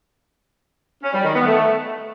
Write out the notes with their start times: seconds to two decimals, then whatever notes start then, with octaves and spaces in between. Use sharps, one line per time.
1.03 C#4
1.14 G3
1.24 D#3
1.35 B3
1.46 A3